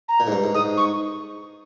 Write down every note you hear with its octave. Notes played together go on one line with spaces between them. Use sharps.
A#5
A#2
G#2
G2
G#2
G#2 D#6
C#6